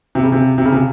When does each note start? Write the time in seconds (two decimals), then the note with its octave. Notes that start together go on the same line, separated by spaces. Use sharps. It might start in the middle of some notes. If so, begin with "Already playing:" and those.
0.15 C3
0.23 C#3
0.32 C3
0.58 C3
0.65 C#3
0.72 C3